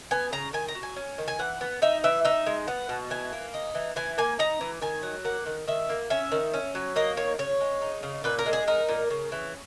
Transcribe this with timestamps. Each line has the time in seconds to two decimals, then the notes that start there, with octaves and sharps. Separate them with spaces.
0.11 B3 G#5
0.32 C#3 A#5
0.53 D#3 G#5
0.68 A#5
0.75 F#3
0.83 G#5
0.96 C#4
1.18 D#3
1.28 G#5
1.39 E3 F#5
1.61 B3
1.82 D#4 E5
2.04 E3 E5
2.25 D#4 E5
2.47 G#3
2.68 B3 F#5
2.89 B2
3.10 E3 G#5
3.32 A#3
3.54 D#4
3.75 E3
3.96 E3 G#5
4.18 A#3 G#5
4.39 D#4 A#5
4.61 E3
4.82 D#3 G#5
5.03 F#3
5.25 A#3 F#5
5.46 D#3
5.68 D#3 E5
5.89 A#3
6.10 C#4 E5
6.32 D#3
6.54 C#4
6.75 F#3
6.96 A#3 D#5
7.17 D#3 C#5
7.39 C#3 C#5
7.61 G#3
7.82 D#4
8.03 C#3
8.24 A#2 B4
8.39 A#4
8.46 G#3
8.53 G#4
8.68 D#4 A#4
8.89 A#2
9.11 C#3
9.32 E3